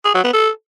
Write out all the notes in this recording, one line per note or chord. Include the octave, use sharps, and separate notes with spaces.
G#4
F#3
B3
A4